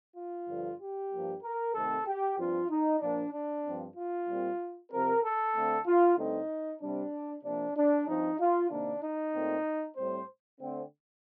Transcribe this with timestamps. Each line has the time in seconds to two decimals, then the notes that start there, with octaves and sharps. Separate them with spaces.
0.17 F4
0.48 G2 D3 F3
0.80 G4
1.12 G2 F3 A#3
1.43 A#4
1.74 C3 D#3 A3 C4 A4
2.06 G4
2.38 G2 F3 C4 F4
2.69 D#4
3.01 A#2 F3 A#3 D4
3.33 D4
3.64 G2 F3 C4
3.96 F4
4.28 A#2 G3 C4
4.90 C3 F3 C4 A#4
5.23 A4
5.55 D3 A3 C4
5.86 F4
6.17 G2 D3 A3 C4 D#4
6.80 C3 G3 C4 D4
7.43 C3 F3 A#3 D4
7.76 D4
8.06 G2 F3 C4 D#4
8.39 F4
8.70 C3 D#3 A#3 D4
9.02 D#4
9.34 A#2 A3 C4
9.96 A2 G3 C4 C5
10.60 D3 A3 C4